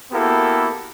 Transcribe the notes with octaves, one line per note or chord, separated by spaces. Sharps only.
A#3 B3 E4 F#4 G4 A4